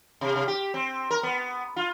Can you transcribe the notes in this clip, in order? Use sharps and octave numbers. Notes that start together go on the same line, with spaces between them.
C3
C3
G4
C4
A#4
B3
F4